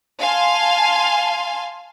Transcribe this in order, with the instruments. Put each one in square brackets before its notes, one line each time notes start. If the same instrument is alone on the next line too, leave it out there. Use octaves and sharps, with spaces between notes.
[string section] F5 G#5 A5 C6